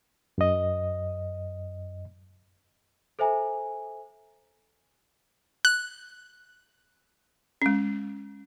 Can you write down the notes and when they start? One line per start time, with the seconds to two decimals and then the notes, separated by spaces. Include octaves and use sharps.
0.38 F#2 D#5
3.19 A4 C5 E5 G#5 A#5
5.65 F#6
7.62 G#3 C#4